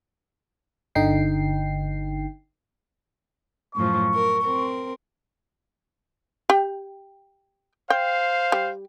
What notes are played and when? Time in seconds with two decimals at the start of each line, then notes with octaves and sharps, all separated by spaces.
0.95 G1 D3 D#4 G5 C7
3.75 F#2 A2 F3 C#6
4.12 A#4
4.40 C4 A#4
6.50 G4 G5
7.90 C5 F5 G5
8.52 G3